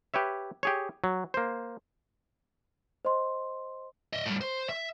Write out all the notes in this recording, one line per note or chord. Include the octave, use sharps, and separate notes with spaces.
G4 B4 C#5 E5
G4 G#4 C#5
F#3
A#3 C5
C5 D#5 C6
D#5 E5
A2 G3
C5
E5